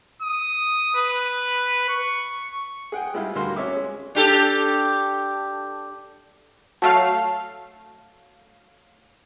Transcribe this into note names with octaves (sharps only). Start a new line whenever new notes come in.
D#6
B4
C#6
G#4 F#5 G5
G3 G#3 E4 F4 F5
D2 G3 F#4 A#4 F5 C6
C#4 C#5 E5 D6
G#3
D4 G4 A4
F#3 A3 F5 A5